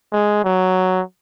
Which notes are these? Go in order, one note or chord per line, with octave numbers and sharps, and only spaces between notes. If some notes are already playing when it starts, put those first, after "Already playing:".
G#3
F#3